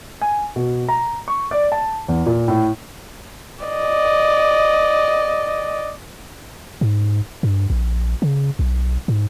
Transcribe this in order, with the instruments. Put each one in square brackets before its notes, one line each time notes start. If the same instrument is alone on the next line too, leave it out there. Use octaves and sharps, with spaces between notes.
[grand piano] G#5
B2
A#5
C#6
D5
A5
E2
A#2
A2
[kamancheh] D5 D#5
[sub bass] G#2
G2
A#1
C#3
B1
G#2